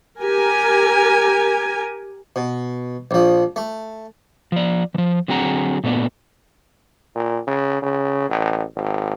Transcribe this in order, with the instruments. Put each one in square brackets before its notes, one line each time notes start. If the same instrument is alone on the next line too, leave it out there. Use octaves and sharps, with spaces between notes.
[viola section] G4 A#4 G#5
[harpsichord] B2
A#1 F3
A3
[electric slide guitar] F3 D5
E3 F3
D3 F#3 C4 G#4 F#5 A#5
A#2 A3 B3 D4
[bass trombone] A#2
C#3
C#3
A1
G#1